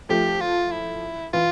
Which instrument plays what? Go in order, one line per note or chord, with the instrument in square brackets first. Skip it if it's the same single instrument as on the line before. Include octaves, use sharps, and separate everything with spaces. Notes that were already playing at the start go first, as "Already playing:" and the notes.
[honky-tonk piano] F3 A3 [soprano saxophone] G4
[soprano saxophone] F4
E4
[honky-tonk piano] E3 [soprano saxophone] F4